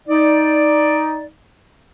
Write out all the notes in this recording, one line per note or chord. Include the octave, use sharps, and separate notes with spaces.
D#4 D5